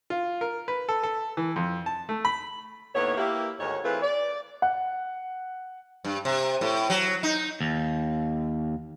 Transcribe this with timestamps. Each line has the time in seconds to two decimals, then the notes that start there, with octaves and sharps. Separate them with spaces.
0.10 F4
0.41 A#4
0.68 B4
0.89 A4
1.03 A4
1.37 E3
1.56 F2
1.86 A5
2.09 A3
2.25 B5
2.95 D#2 A2 B3 C#5
3.17 A#3 E4 G4
3.60 D2 G#2 D#3 C#5
3.84 E3 A3 C4 F4 G#4 B4
4.02 D5
4.62 F#5
6.04 G2
6.25 C3
6.61 A2
6.90 F#3
7.23 D#4
7.61 D#2